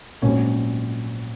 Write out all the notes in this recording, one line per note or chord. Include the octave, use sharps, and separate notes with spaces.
A#1 G#2 F#3 B3 C#4 C#5